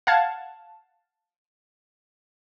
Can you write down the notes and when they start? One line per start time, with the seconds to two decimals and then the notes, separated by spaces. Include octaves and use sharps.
0.07 F5 F#5 A5 G#6